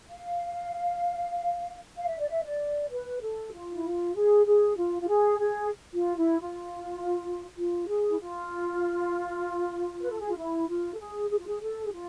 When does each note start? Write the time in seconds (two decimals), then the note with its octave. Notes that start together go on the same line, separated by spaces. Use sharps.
0.10 F5
1.97 F5
2.08 E5
2.19 D5
2.29 E5
2.44 D5
2.90 B4
3.21 A4
3.52 F4
3.72 E4
3.83 F4
4.15 G#4
4.46 G#4
4.77 F4
5.01 F4
5.08 G#4
5.39 G#4
5.93 F4
6.17 E4
6.40 F4
7.57 F4
7.88 G#4
8.09 E4
8.19 F4
10.01 B4
10.10 A4
10.19 G#4
10.28 F4
10.37 E4
10.68 F4
10.94 A4
10.99 G#4
11.30 G#4
11.38 F4
11.47 G#4
11.62 A4
11.85 G#4
11.92 F4